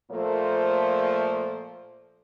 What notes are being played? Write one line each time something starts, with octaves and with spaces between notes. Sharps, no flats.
A#2 F3 A3 A#3 A4 C5